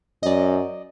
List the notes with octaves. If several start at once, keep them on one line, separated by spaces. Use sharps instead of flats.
F#2 D5 D#5